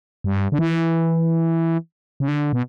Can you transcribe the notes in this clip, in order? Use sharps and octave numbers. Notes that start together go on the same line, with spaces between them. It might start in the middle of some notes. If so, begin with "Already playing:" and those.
G2
D3
E3
C#3
D3
B2